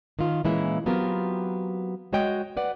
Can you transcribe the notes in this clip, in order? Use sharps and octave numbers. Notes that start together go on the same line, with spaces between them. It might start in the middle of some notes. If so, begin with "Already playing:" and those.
D#3 F4
A#2 E3 G#3 A#3 C#4 E4
F#3 B3 C4 F4 G4 A#4
G#3 F#4 C#5 D#5 G5
B4 D5 F#5